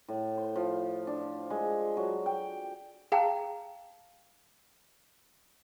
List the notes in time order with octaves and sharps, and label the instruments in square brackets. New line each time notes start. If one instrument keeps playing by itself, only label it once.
[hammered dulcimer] A2
C5
F3
D4
G#3
F#3
G5
[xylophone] G#4 F5 G5 A5 A#5